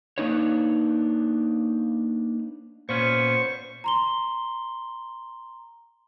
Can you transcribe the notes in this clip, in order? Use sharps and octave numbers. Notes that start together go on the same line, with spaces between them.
A#3 B3 D4 D#4 B4 C#5
A#2 B3 C#4 C5 C#6
A#5 C6 G7